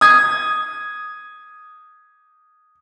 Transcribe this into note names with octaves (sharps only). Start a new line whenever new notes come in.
D#6 G#6